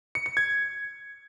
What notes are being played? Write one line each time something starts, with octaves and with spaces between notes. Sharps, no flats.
C#7
C#7
G#6